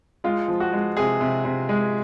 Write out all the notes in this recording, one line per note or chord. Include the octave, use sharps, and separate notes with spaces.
G#3 F4
F3
F#4
G#3
C3 G#4
C3
C3
G#3